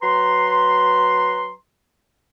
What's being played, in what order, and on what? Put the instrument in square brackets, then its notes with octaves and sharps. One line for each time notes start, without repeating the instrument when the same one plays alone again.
[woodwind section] F#3 B4 A#5 C6